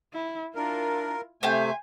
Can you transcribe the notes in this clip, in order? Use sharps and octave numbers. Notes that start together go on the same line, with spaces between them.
E4
D4 E4 F4 A#4
C3 A3 C5 E5 F5 G5 G#5